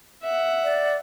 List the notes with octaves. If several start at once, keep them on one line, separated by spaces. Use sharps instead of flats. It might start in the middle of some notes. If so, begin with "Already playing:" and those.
E5 F#5
D5